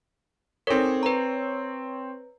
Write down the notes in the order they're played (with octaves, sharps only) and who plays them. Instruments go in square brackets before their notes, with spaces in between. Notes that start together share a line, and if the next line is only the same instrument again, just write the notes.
[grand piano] C4 C#5 [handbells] D#4 A4 A#4
[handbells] B4 A#5